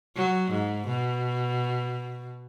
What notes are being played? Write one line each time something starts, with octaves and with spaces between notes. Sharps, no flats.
F#3
G#2
B2